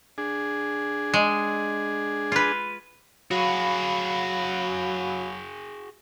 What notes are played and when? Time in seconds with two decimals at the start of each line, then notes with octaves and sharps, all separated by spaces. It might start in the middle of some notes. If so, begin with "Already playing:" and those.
0.18 D4 G#4
1.14 G#3
2.32 F4 B4
3.31 F#3 F#4 G#4 F5 B5